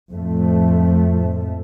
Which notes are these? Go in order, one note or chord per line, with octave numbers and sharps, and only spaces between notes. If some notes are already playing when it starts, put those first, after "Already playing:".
F2 A2 F3 A3